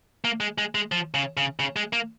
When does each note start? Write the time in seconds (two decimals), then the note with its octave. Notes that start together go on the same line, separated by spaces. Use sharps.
0.25 A#3
0.40 G#3
0.58 G#3
0.75 G#3
0.92 F3
1.14 C#3
1.37 C#3
1.60 C#3
1.76 G#3
1.93 A#3